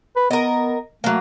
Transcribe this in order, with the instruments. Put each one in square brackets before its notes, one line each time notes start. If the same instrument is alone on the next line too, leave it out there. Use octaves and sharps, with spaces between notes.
[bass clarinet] B4
[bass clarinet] B3 [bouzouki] A#4 D#5
[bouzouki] F#3 A#3 [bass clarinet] A3